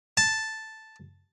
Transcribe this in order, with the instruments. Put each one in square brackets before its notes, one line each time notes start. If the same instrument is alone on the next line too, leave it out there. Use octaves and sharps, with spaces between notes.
[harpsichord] A5